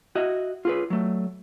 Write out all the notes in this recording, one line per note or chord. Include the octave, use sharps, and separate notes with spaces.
F#4 D#5 E5
F4 G#4 B4
F#3 A3